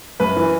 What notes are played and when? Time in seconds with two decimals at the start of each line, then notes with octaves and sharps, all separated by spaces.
0.20 F#2 B4
0.36 E3